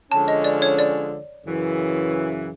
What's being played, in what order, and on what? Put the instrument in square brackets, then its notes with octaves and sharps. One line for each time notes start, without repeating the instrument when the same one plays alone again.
[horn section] D3 F3 G#3 C#4 [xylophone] A5
[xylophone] D#5
D5
C#5
D5
[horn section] F#2 C#3 E3